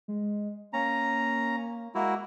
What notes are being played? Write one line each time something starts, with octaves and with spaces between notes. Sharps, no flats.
G#3
A#3 C#4 A#5
G#3 A#3 E4 F#4